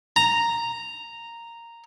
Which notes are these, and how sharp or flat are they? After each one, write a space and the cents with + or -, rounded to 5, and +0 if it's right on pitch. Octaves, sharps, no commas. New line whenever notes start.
A#5 -5